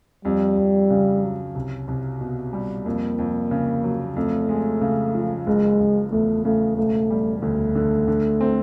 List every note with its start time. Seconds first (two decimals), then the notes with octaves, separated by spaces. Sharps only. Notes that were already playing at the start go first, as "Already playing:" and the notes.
0.25 F2 G3
0.57 F2
0.90 C#3
1.23 F#3
1.55 C2
1.88 C2
2.21 B2
2.53 G3
2.86 F2 A#3
3.18 F2
3.51 C#3
3.84 F#3
4.16 F2 A3
4.49 G#3
4.81 C#3
5.14 F3
5.47 F#1 G#3
5.80 F#1
6.12 E2 A3
6.45 C#3 A3
6.77 E1 A3
7.10 G3
7.42 D2 A3
7.75 D3
8.08 D3
8.41 C4